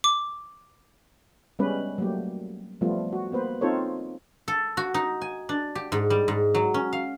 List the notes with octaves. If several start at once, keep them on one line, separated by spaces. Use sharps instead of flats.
D6
G3 G#3 B3 C#4 G4 B4
F#3 G3 A3 A#3 G4
F3 G3 A3 B3 F4
F#4
A#3 B3 B4 C5
C4 D#4 F4 A4 C5 C#5
A4
F#4
D#4
G#5
D4
G4
G#2
G3
G#2
F#3
C#4
F5